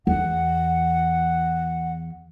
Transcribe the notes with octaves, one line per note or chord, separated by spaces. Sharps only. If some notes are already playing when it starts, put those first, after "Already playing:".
E2 F#5